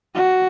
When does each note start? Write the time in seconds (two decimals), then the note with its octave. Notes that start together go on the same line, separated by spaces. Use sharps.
0.15 F#4